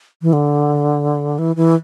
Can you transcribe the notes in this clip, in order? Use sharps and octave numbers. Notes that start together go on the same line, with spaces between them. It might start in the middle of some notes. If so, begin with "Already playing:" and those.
E3
D3
E3
E3